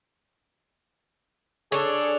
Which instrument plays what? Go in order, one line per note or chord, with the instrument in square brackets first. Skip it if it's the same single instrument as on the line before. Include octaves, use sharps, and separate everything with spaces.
[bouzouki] D4 C#5 [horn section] G#4 A4